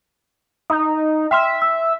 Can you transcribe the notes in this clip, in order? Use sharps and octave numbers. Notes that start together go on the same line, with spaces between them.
D#4 D#6
E5 G5 C6 F6
E6